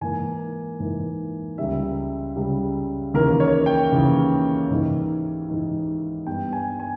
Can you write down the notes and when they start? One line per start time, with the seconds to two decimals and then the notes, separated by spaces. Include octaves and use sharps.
0.01 G#2 E3 A#3 D#4 G#5
0.79 G#2 E3 A#3 D#4
1.58 C#2 C#3 G3 E5
2.36 C#2 C#3 G3
3.14 D#2 C#3 E3 A#3 A#4
3.40 C#5
3.66 G5
3.92 D#2 C#3 E3 A#3
4.70 G#2 E3 G#3 D#4
5.48 G#2 E3 G#3 D#4
6.27 G2 G3 B3 G5
6.53 G#5
6.80 G#5